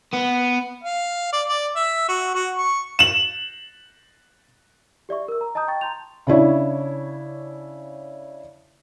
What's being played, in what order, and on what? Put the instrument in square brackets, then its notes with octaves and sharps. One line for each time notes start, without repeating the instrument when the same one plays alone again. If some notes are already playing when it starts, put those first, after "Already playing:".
[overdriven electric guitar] B3
[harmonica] F5
D5
D5
E5
F#4
F#4
C#6
[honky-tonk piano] E7 F#7
[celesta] G4 D5 E5 C#6
A#4 E6
A#5
D#5 A5 A#5 D#6 G6
G5 C#6 A6
A5 A#5 C6 G6 F7
[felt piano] C#3 D4 E4 C#5